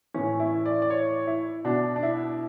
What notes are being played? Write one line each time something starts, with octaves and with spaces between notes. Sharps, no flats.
A2 E3 C#4
E4
D5
D5
C#5
E4
B2 D4
D4
E4